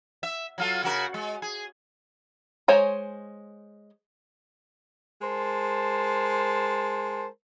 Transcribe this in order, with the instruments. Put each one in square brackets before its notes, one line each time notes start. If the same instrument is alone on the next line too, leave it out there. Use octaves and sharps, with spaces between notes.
[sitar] E5
F#3 F4 A4
C#3 F#4 A#4
G#3
G#4
[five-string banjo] G#3 C5 C#5 G#5 A#5
[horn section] G#3 A#4 C5 A5